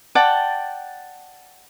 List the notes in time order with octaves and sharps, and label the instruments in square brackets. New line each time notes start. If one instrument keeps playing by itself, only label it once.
[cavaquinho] D5 F#5 G5 A5